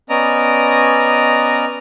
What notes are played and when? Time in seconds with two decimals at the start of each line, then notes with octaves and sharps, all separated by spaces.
0.09 B3 C#4 D5 D#5 A#5